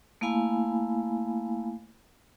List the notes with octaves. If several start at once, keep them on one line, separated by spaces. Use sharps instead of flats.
A3 A#3 E4 F5 G#5 B5